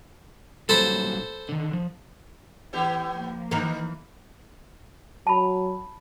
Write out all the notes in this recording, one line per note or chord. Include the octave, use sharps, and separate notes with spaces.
A#2 F#3 G3 A4 C5 B5
D3 D#3
F3
A2 E3 B3 G4
F3 A#3
D#3 E3 D#4 A#4
F#3 A5 B5